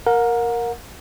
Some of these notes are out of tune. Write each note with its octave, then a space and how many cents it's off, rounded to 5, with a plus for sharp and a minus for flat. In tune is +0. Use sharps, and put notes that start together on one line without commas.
A#4 +0 F#5 -40